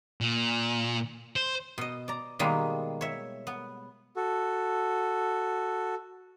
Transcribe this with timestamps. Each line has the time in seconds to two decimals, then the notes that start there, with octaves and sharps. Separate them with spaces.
0.21 A#2
1.36 C5
1.78 B2 D#5
2.08 D5 A#5
2.39 B2 D#3 G3 G#3 A#3
3.01 C#5 E5
3.47 B3
4.16 F#4 A4